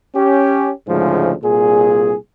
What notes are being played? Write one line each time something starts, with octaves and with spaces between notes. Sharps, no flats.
C#4 G4
D2 G#2 C#3 F3 G#3
C2 A#2 G#4